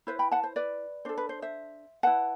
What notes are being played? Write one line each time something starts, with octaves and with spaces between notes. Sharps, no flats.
E4 B4 C5
G5 B5
F#5 A5
C5
B4 D5
D4 A4 C5
B4
C5
C5 E5
E4 B4 F#5 A5